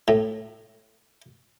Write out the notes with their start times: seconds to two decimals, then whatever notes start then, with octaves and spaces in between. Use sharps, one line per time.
0.08 A2